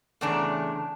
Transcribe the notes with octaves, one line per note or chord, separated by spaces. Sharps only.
E2 A2 C#3 A3 D4 A#5